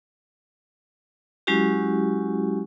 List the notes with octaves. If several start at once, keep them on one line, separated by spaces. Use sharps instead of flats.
F#3 G#3 C#4 E4 F#4 G4